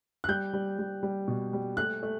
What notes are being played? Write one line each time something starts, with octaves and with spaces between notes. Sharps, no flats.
F#6
G3 G6
G3
G3
G3
B2
G3
A3 F#6
A3